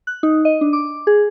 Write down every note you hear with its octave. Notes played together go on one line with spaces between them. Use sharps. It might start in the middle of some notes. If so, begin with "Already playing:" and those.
F#6
D#4
D#5
D4
D6
G#4